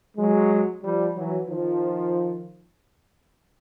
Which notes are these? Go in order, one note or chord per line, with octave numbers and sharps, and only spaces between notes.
F#3 G#3
F3 G3
E3 F#3
D#3 F3